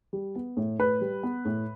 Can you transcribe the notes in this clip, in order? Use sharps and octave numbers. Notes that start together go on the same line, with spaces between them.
G3
B3
A2
A2 B4
G3
B3
A2